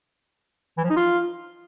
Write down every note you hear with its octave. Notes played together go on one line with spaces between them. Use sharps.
E3
F3
D#4
F4